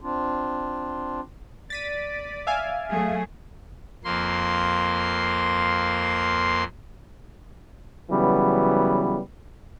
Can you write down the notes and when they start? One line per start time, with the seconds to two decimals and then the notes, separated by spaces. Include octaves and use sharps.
0.01 C4 D4 F4
1.70 D5 A6 B6 D#7
2.47 E5 F5 G#5
2.90 F#3 A3 G#4
4.04 F2 A#3 C6
8.10 C#3 E3 F#3 G3 B3